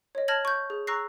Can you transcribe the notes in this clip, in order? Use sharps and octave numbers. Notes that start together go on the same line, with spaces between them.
C#5 D#5
A5 F6 G#6 A#6 F#7
C#6 G6
G#4
A#5 C#6 E6 F#6 A#6 C7